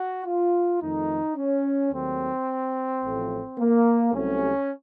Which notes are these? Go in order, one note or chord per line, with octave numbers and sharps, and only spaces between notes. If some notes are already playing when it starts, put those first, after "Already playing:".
Already playing: F#4
F4
F2 D#3 A3 D#4
C#4
D#2 D#3 F#3 A3 C4
A1 A2 F3 A3
A#3
C2 C3 F#3 A3 C#4